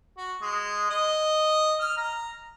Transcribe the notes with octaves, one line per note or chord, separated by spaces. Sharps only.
F#4
G#3
D#5
F6
A#5